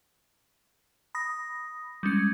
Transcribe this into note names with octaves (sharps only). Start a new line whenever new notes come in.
B5 D#6 A#6
G3 G#3 C#4 G#6